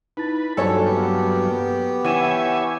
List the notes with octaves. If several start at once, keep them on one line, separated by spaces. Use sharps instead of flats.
D#4 E4 B4 A6
G2 F#3 A#3 A4 C#5 G#5 A5
B3 G4
E3 C#5 E5 F#5 G#5 D#7 E7